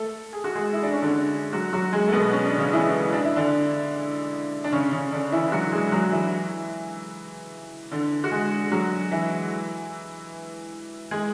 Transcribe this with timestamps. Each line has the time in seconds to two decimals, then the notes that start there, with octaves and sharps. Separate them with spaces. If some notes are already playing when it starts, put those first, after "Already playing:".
Already playing: A3 A4
0.33 G#4
0.44 F#4
0.55 G#3 G#4
0.73 E4
0.83 D4
0.93 C#4
1.02 D3 D4
1.53 F#3 F#4
1.73 F#3 F#4
1.93 G#3 G#4
2.08 A3
2.13 B2 B3
2.32 C#4
2.45 D4
2.58 C#3 C#4
2.73 E3 E4
3.13 D4
3.25 E4
3.36 D3 D4
4.64 D4
4.72 C#3 C#4
4.92 C#3 C#4
5.12 D3 D4
5.32 E3 E4
5.52 F#3 F#4
5.72 G#3 G#4
5.92 F#3 F#4
6.12 E3 E4
7.91 D3 D4
8.24 F#4
8.31 G#3 G#4
8.71 F#3 F#4
9.11 E3 E4
11.11 G#3 G#4